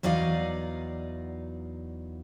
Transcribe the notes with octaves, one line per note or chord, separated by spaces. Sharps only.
E2 F#3 D#4 D5 D#5 F5